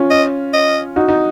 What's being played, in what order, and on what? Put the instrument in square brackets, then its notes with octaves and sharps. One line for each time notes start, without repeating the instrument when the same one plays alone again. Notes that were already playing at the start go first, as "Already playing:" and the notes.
Already playing: [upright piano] C#4 F4
[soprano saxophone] D#5
D#5
[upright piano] D#4 F#4
D#4